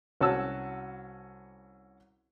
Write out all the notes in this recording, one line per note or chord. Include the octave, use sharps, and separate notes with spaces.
C2 C#4 F#4 A5 E6